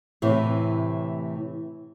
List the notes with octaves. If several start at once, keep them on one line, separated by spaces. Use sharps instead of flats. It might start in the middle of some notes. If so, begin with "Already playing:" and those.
A2 C3 E3